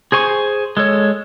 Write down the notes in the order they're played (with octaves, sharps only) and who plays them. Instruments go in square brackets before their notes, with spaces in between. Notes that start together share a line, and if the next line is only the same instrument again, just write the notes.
[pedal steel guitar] G#4 C5 G#5 C#6
G#3 A4 C#5